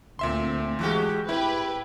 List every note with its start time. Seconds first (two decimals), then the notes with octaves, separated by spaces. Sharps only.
0.19 D2 A#2 A3 C4 E5 C6
0.79 A2 E3 G#3 F#4 G4
1.29 C4 E4 G4 B4